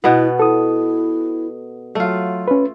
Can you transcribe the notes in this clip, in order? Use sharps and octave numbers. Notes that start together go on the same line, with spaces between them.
B2 B3 E4
E4 A4 D#6
F#3 A3 F4
C#4 B4